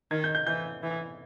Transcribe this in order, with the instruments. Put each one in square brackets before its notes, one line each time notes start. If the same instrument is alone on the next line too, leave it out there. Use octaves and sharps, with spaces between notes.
[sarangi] D#3 [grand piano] G#6
[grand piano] G6
G6
[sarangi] E3 [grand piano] G6
[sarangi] E3